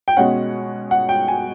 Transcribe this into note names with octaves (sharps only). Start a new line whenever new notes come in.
G5
B2 G#3 C#4 F#5
F#5
G5
G#5